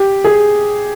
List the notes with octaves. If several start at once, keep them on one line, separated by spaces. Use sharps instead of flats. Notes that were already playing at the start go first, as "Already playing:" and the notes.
Already playing: G4
G#4